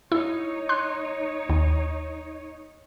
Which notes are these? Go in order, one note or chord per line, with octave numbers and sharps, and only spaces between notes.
D#4 E4 C#5
C6 F#6
D#2